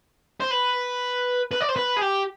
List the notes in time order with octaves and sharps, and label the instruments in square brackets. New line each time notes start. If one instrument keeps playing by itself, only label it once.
[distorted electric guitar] C5
B4
B4
D5
C5
B4
G#4
G4